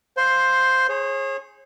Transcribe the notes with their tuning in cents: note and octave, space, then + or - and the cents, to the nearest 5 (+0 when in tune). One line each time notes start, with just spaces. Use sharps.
C5 +0 F5 +5
G#4 +0 C#5 -40